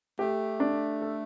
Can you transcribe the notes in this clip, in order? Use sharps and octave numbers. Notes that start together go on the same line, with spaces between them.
A3 G4
D4
A4